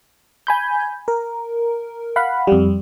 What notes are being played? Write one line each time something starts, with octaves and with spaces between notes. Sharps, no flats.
G#5 B5 G6
A#4
F5 F#5 B5
F2 G3